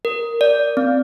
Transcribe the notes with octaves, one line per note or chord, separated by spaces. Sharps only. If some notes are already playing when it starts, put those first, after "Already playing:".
A#4
D5
C4